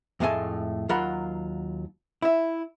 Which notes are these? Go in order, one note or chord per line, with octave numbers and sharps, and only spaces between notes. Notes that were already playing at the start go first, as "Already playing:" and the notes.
F2 A2 G#3 A3 G#5 A5
D#2 F#3 F4 A#4 F#5 B5
E4 E5